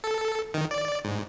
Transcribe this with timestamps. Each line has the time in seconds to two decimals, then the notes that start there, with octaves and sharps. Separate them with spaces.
0.04 A4
0.54 D#3
0.71 D5
1.05 G#2